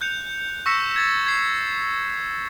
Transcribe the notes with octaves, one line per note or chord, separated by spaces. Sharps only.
F#6 G6 C#7 F7
C#6 E6 A#6 B6 C#7 E7
G#6 A6
G#6 C7